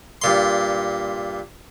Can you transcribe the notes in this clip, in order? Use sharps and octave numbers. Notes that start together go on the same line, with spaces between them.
G2 A#2 C6